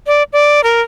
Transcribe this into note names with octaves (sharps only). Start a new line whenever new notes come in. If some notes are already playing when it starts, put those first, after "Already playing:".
D5
D5
A#4